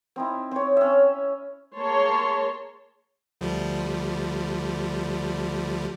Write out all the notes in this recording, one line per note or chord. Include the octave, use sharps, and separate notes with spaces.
C4 D#4 E4
C4 C#5
C#4 E5
A#3 G#4 C#5 A5 C6
D2 F3 G3